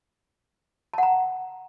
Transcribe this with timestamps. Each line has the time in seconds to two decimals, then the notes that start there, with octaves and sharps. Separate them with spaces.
0.94 A5
0.98 F#5
1.03 A#5